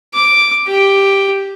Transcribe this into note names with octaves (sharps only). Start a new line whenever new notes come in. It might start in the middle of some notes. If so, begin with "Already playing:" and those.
D6
G4